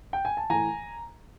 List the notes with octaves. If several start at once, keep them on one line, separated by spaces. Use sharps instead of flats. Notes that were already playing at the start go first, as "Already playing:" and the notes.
G5
G#5
A5
A2 E3 G#5 A#5